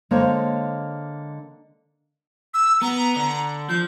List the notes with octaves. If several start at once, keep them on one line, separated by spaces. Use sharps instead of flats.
D3 G#3 A#3 C5 C#5
E6
B3 A#5
D3
F3 G6